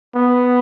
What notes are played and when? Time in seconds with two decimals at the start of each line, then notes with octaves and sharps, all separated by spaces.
0.15 B3